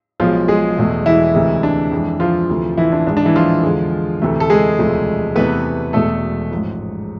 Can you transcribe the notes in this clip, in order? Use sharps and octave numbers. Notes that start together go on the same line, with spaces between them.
B1 B2 F3 G#3 F4
G#3 G#4
E1 E2 B2 A3
E3 E4
D2 C3 E3 G#3
D4
F2 E3 G#3
F3 F4
D2 C3 E3
E3 E4
D4
G#1 G#2 G#3 D4
D4
E3 E4
F3 F4
E2 D3 G#3
D2 C3 E3 A3
A4
G#3 G#4
E1 D2 C3 F3 A3
E2 C3 E3 A3 B3 B4
E1 E2 B2 G#3 A3 A4
A1 G#2 F3